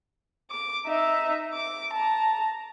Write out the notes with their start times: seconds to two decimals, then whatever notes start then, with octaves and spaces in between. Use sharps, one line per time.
0.51 D6
0.87 D#4 E5
1.54 D6
1.93 A5 A#5